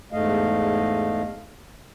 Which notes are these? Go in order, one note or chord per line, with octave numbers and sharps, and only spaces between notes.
E2 G#2 A3 D#5 F5